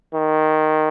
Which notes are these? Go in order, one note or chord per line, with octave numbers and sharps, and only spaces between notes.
D#3